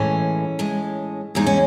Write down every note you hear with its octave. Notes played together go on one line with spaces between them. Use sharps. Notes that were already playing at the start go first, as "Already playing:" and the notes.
Already playing: A2 E3 G#3 C#4
A2 G#3
E2 C#3 G#3 D#4
C#4